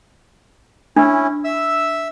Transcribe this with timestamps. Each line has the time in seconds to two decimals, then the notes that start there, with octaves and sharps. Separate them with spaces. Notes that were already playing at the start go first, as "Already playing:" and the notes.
0.96 C#4 D4 E4
1.44 E5 E6